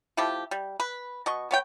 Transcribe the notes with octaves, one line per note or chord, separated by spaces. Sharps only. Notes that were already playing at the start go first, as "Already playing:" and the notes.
F3 A3 E4 G4
G3
B4
B2 D#5 C#6
B3 C#5 G5